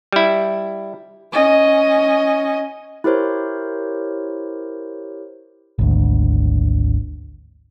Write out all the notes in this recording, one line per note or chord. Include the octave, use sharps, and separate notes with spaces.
G3 E4
C#4 D#5
E4 G4 A#4 C5 C#5
G#1 D2